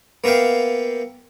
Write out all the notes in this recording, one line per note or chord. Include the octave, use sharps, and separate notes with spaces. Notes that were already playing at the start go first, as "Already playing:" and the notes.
A#3 B3 E5 F5 G5